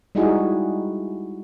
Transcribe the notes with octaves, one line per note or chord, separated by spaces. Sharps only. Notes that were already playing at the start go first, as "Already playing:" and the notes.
G3 G#3 D#4 E4 F#4 G#4